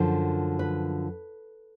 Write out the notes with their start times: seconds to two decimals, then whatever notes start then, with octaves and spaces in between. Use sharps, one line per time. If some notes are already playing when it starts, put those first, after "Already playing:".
Already playing: F#2 D3 F3 C5
0.59 B4